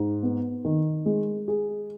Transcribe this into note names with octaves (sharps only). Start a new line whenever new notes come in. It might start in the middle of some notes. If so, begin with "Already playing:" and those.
Already playing: G#2
B3
D#3
G#3
G#4